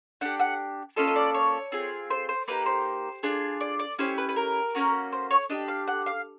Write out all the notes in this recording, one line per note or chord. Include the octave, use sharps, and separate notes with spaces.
D4 G4 F#5
F#5
A#3 C#4 F4 A4 D#5
D#5
D5
C#5
C4 F4 G#4
C5
C5
A#3 D#4 G4 B4
C5
D4 F4 G#4
D5
D5
C#4 E4 G4 C5
B4
B4
A#4
A#3 C#4 F#4
C5
C#5
D4 G4 D#5
F5
F#5
F5